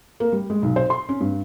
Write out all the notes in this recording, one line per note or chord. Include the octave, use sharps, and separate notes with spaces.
A#3
G3
G#3
B1
C5
C6
C#4
G2